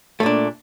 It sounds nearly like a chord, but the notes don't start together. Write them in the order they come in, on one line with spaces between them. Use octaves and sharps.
A3 A#2 D4